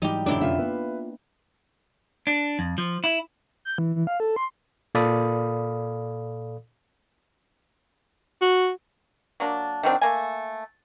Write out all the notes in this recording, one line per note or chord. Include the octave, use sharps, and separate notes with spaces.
G#2 E3 F#3 G3 D#4 G4
F#2 B2 D3 D4 E4 G4 D5
F2 C3 C#4 F4 E5
A#3 B3 B4 F5
D4
F2
F3
E4
G6
E3
E3
F5
A4
C6
A#2 A4 D5 F5 B5 D#6
F#4
F#3 A#3 D4
D#3 F#3 C4 D4
A3 A#3 G#5